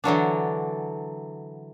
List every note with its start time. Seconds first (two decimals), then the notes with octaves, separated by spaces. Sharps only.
0.04 D3 E3 F#3 D4